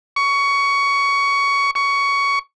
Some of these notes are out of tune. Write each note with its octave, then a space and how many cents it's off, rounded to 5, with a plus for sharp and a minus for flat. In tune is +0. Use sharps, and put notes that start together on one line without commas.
C#6 +15
C#6 +15